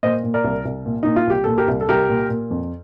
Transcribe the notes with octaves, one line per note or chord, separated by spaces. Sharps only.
A#2 C5 D#5
A#2
A#4 D5
C2
C2
A#2
A#2 D#4
F4
C2 G4
A#2 A4
G4 A#4
C2
A4
C2 G4 A#4
A#2
A#2
F2